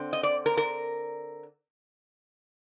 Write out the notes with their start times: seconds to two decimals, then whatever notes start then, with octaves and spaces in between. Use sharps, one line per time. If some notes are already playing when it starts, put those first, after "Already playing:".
Already playing: D3 C4
0.13 D#5
0.23 D5
0.46 A#4
0.57 A#4